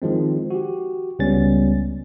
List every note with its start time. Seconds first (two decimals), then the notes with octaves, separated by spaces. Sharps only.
0.02 D#3 F3 G#3 C4
0.51 F#4 G4
1.19 C#2 G3 B3 C#4 A6